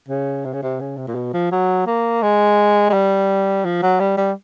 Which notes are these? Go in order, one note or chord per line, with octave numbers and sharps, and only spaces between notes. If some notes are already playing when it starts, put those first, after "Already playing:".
C#3
C3
C#3
C3
C#3
C3
A#2
B2
F3
F#3
A#3
G#3
G#3
G3
F3
F#3
G3
G3